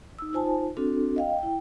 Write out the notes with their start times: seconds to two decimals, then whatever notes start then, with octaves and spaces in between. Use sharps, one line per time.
0.19 D#4 E6
0.33 D#4 F4 C5 G#5 A5
0.77 C4 D4 F#4 A4
1.16 D#5 F5 G5
1.39 E4 G5